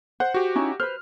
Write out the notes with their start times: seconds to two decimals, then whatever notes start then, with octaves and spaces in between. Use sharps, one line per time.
0.20 C5 F#5
0.34 F#4 G4
0.55 C#4 D#4 E4
0.80 B4 C5 F6